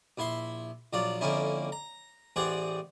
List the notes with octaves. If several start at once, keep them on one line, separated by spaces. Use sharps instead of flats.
A#1 E4 E5 C6
A#1 F#3 F4 D5
F2 D3 A#3 C#4 E4
A#5
A1 C4 G#4 D5 F#5